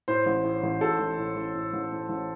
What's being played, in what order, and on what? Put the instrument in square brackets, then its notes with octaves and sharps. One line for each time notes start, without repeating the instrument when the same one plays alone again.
[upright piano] A2 C5
A1
A2
A1
A2 A4
A1
A2
A1
A2
A1
A2
A1